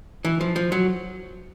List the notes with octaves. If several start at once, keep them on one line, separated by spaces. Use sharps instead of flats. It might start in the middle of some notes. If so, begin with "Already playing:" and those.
E3
F3
F3
F#3